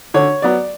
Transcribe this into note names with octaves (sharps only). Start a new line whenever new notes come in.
D3 C#5
F#3 B3 D5